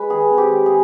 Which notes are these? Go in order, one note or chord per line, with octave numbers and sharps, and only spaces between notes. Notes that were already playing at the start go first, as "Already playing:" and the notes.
Already playing: G#3 B4
D#3 G#4
C4
G4
G#3
G#4